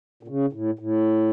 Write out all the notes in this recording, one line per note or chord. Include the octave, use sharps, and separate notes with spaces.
A#2
C#3
A2
A2